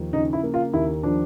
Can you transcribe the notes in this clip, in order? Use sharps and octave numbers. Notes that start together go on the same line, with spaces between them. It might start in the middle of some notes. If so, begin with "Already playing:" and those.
Already playing: D#2 F3
C#3 D#4
E4
A#3
F4
D#2 E4
F3 D4